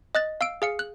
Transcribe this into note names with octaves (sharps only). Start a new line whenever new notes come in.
D#5 F#6 A6
F5 E6 D7
G#4 F5 C#7
F#6